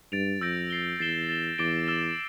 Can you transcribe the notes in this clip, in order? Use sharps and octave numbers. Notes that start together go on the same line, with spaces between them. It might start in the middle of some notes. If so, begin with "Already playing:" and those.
G2 A6 D7 F7
F2 E6 G6 A#6 D7
A6 C7 G7
E2 A6 C7 E7 G7
A6 E7 G7
E2 D6 A6 D7 G7
E6 A6 E7 G7